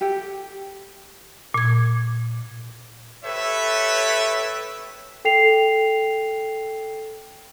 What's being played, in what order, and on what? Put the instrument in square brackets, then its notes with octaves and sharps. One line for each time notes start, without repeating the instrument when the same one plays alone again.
[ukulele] G4 A4 G5
[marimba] A#2 G#6
[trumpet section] G4 A4 B4 C#5 E5
[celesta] A4 G5 C7 F7